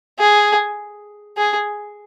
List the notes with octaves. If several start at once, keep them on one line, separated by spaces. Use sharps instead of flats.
G#4
G#4